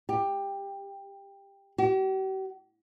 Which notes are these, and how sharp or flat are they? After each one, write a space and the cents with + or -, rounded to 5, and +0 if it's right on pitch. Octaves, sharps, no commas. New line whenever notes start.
G4 +15
G4 -45